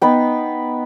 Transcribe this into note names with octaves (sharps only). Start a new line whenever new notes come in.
B3 D#4 B4 G5